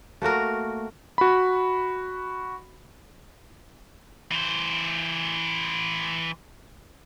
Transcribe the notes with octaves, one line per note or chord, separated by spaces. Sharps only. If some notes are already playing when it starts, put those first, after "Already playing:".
A3 A#3 F#4 A#4
F#4 B5
E3 C5